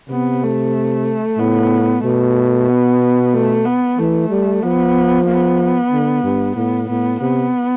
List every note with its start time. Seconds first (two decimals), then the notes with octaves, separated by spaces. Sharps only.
0.09 C3 B3
0.42 A3
1.39 A2 B3
2.03 B2 A3
2.69 B3
3.33 A3
3.65 B3
3.98 E3 A3
4.30 G3
4.62 F3 B3
5.27 B3
5.92 D3
6.24 G2
6.56 A2 B3
6.89 A2 B3
7.21 C3 B3